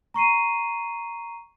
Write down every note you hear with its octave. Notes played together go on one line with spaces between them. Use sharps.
A#5 C#6 C7 D#7